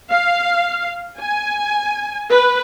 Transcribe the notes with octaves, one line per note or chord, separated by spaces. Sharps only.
F5
G#5
B4